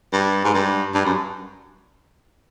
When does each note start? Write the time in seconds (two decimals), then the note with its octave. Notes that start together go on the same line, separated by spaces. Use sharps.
0.13 G2
0.45 G#2
0.54 G2
0.95 G2
1.05 F#2